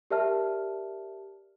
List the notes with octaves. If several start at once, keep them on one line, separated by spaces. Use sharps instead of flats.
G4 A#4 D5 E5 A5 F6